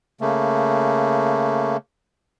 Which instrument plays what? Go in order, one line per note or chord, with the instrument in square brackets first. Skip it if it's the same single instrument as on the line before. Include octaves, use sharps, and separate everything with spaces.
[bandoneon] C#3 A3 A#3